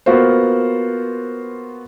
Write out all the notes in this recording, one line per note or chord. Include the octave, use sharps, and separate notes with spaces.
A#3 B3 F4 F#4 C5